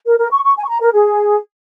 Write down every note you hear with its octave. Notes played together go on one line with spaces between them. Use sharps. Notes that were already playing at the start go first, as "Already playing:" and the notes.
A#4
A#4
C#6
C#6
G#5
C#6
A#5
A#4
G#4